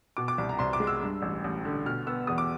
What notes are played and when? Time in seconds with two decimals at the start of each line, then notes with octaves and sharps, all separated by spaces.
0.17 B2 D6
0.28 D6
0.38 C2
0.49 A#5
0.59 C2 C6
0.73 D6
0.80 G#3
0.87 E6
1.02 G2
1.22 A1
1.44 A1
1.65 D3
1.86 B2 F6
2.07 B3 E6
2.27 E2 D#6
2.38 D6